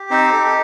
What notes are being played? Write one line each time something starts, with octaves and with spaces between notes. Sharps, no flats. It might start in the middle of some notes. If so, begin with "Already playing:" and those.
Already playing: G4
C4 D#4 C5
A4
A4